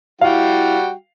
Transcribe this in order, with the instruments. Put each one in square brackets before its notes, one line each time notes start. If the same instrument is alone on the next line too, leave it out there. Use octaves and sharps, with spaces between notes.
[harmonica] G3 F#4 G5 [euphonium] E4 [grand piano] F5